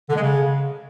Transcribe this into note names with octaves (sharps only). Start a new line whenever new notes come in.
D3
G#3
C#3